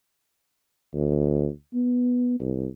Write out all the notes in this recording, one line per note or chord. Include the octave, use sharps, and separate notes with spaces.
D2
B3
C2